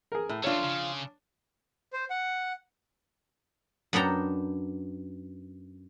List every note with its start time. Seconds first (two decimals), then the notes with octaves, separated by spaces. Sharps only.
0.12 G#4 A#4
0.29 A2
0.44 F3 A3 C4 D4 F4 C#5
0.64 C#3
1.93 C5
2.10 F#5
3.93 F#2 B3 D4 G5 A#5